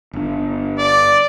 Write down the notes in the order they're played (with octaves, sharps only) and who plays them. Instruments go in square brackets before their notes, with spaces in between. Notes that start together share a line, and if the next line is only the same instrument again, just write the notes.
[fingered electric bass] G1 D4
[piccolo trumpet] D5